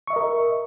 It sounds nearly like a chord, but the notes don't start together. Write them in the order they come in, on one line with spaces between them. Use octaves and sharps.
C#6 E5 D#5 A#4